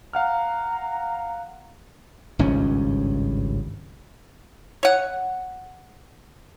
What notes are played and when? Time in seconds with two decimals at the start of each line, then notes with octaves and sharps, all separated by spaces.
0.13 F5 F#5 A#5 F6
2.39 G#1 C#2 G2 C#4
4.83 C#5 F#5